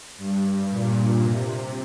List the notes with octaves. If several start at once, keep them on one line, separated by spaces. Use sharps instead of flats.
G2
A#2
C3